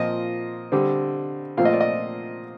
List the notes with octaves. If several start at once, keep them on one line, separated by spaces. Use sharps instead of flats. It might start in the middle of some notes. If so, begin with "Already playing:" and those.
Already playing: A#2 F3 C4 D#5
D3 G3 C4
A#2 F3 A3 C4 F5
D#5
D5
D#5